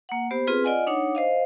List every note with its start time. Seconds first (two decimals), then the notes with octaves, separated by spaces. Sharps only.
0.09 A#3 F#5
0.31 B3 G4 C5
0.47 C4 F4 G#4 B4
0.64 F4 D5 D#5 F#5 G#5
0.87 D4 D#4 C#5 F#5 D6
1.15 C5 D#5 F5